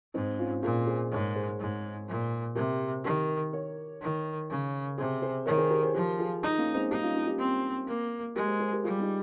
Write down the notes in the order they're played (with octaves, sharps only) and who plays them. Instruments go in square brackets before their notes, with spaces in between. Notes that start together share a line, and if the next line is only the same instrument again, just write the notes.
[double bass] G#2 [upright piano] C4 D#4
[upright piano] C#4 F4
[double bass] A#2 [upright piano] F4 G#4
[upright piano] G#4 C5
[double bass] G#2 [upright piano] A#4 C#5
[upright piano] G#4 C5
[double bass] G#2
A#2
[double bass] C3 [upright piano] G4 A#4
[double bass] D#3 [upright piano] G4 A#4
[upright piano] A#4 C#5
[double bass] D#3
C#3
[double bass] C3 [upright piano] G#4 C5
[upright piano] G#4 C5
[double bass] D#3 [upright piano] A#4 C#5
[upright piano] G#4 C5
G4 A#4
G#4 C5
[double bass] F3 [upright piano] G4 A#4
[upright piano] F4 G#4
[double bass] D#4
[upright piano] A#3 C#4
G#3 C4
[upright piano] G3 A#3 [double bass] D#4
[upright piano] C#4 F4
C#4 F4
D#4 G4
[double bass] C4
A#3
[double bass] G#3 [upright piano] G4 A#4
[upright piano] G#4 C5
G#4 C5
G4 A#4
[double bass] G3 [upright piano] F4 G#4
[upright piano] D#4 G4